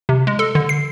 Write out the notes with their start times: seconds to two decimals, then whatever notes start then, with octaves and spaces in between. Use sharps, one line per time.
0.09 C3
0.27 G#3
0.39 A4
0.55 D3
0.69 C7